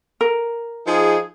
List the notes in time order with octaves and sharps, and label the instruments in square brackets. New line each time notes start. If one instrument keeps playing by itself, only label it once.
[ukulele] A#4
[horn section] F3 D#4 G#4